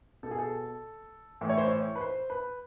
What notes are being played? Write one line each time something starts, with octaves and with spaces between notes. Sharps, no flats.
B2 A4
G#4
A4
A2 E3
C#5
C5
C#5
B4
C5
B4